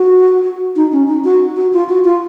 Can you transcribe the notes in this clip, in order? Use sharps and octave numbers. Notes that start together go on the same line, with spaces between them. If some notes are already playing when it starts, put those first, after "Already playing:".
Already playing: F#4
D#4
C#4
D#4
F#4
F#4
F4
F#4
F4